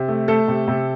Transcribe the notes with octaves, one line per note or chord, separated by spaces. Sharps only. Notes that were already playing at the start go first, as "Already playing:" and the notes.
Already playing: C3
A3
A3 A4
C3
C3